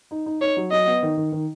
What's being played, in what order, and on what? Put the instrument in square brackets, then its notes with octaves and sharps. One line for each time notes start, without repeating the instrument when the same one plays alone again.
[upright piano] D#4
D#4
[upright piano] D#4 [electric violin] C#5
[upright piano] F#3
[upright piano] F#3 [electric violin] D#5
[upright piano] B3
D#3
D#3
D#3